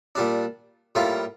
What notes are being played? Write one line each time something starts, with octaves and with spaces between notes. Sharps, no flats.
A#2 G3 D4
A2 G3 A#3 F4